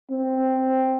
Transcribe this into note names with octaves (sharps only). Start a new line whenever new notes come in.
C4